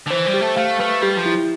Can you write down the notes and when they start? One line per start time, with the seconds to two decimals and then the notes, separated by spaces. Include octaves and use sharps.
0.07 D3
0.11 E3 C5
0.27 G3
0.34 G4
0.41 A3
0.56 A3 F5
0.79 A3 B4
1.02 G3 G4
1.17 F3
1.26 E4